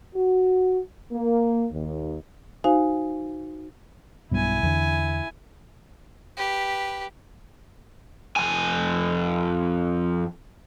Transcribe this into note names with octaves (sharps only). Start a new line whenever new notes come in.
F#4
A#3
D#2
D#4 F#4 C5 F5 G#5
B1 G2 B2 E4 G#5
E2 D3
G4 B4
F2 G#5